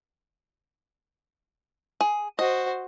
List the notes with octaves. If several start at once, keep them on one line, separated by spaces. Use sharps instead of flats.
G#4
F#4 C5 D#5